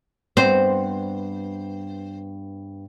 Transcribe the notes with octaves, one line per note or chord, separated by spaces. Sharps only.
G2 B3 C4 C5